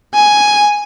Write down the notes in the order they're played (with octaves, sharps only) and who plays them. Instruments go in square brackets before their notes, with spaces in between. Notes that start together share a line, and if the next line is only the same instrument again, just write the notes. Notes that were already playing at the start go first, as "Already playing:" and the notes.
[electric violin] G#5